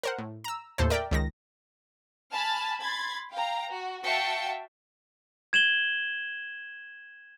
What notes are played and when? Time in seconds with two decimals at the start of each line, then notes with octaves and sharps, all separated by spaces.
0.03 A#4 C5 F#5
0.19 A2
0.44 A#5 E6
0.78 D#2 A2 A4 C5
0.90 A#4 D5 E5 G5
1.11 C#2 D#3 A#6
2.31 G#5 A5 B5 F6 A6
2.80 B5 C6 G#6 A6
3.31 F5 G5 A#5
3.70 F#4
4.03 F#4 E5 F5 G5 A5 C#7
5.53 G#6 E7 F#7 G7